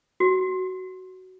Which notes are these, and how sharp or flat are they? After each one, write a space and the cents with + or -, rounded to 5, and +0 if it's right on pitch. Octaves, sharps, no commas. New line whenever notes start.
F#4 +10